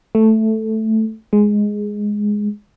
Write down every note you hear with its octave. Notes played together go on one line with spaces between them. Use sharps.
A3
G#3